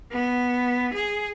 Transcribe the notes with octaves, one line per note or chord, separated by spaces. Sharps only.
B3
G#4